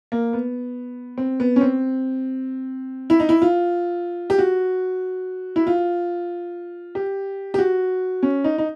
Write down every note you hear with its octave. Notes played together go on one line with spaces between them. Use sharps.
A#3
B3
C4
B3
C#4
C4
E4
D#4
E4
F4
G4
F#4
E4
F4
G4
G4
F#4
C#4
D#4
D#4